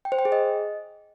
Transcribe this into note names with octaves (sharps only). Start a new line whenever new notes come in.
G5
C5
G5
G#4
D#5